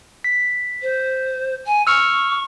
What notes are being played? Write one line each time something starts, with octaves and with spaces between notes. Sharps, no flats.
B6
C5
G#5
C#6 E6 F6 C#7